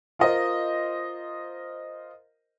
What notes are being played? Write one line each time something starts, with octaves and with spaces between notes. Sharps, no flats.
F4 A#4 C5 D#5